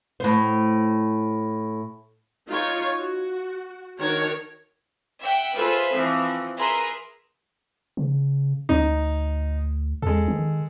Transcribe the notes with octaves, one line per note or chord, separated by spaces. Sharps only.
A2 C5
D#4 F4 C#5
F#4
D#3 D4 F#4 A#4 C#5
E5 F#5 G5
F4 G#4 A4 B4 C5 E5
E3 F3 C4
G#4 A#4 B4 E5 A#5 C6
C#3
D2 D#4
E2 G#3 A4
D#3